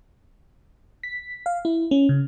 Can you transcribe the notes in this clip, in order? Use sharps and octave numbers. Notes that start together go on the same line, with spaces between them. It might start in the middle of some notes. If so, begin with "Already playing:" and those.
B6
F5
E4
C#4
C#3